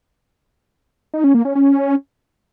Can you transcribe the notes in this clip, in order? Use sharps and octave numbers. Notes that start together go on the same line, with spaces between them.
D#4
C#4
A#3
C#4
C#4